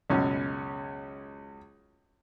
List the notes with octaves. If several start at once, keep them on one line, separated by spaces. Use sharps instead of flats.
C#2 F#2 B2 C#4